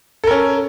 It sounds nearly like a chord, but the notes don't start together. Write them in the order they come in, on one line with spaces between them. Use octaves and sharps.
A4 A#4 C#4